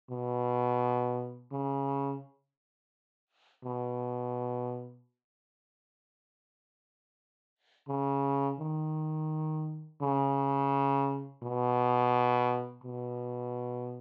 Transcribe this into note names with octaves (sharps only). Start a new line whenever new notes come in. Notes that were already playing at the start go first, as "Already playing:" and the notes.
B2
C#3
B2
C#3
D#3
C#3
B2
B2